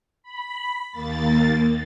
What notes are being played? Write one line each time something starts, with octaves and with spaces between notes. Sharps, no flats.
B5
D#2 A#3 A6